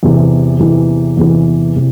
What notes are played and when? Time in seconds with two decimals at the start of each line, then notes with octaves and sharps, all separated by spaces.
0.03 E2 C3 E3
0.60 E2 C3 E3
1.17 E2 C3 E3
1.76 C3